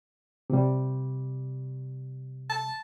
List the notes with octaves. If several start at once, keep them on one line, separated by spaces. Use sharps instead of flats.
C3 G3
A5